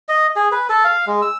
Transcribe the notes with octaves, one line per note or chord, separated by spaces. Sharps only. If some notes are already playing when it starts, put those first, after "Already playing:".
D#5
G#4
B4
A4
F5
G#3
E6